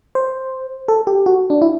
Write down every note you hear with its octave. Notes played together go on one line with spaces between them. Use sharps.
C5
A4
G4
F#4
D4
E4